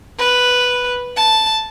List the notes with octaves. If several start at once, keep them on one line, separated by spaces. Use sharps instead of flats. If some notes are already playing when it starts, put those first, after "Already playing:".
B4
A5